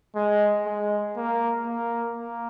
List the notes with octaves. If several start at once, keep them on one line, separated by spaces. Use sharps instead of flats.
G#3
G#3
A#3
A#3
A#3